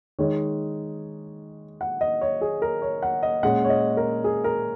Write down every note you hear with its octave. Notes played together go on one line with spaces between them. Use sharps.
D#3 G#3 D#4 C#5
F#5
D#5
C#5
G#4
A#4
C#5
F#5
D#5
A#2 G#3 C#4 F#5
C#5
D#5
A#4
G#4
A#4